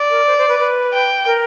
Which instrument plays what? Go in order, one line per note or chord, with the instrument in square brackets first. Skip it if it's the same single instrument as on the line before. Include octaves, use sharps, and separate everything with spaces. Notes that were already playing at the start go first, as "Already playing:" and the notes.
Already playing: [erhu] D5
[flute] A#4
C5
C5
B4
B4
[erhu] G5
[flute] A#4